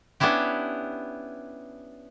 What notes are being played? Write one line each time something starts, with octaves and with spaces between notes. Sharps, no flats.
B3 C#4 D4 E4 G4